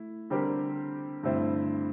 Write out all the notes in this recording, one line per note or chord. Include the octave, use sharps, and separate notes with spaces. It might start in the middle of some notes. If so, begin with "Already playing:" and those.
Already playing: A3 E4
D3 G3 C4 G4 A#4
G2 D3 A3 C4 E4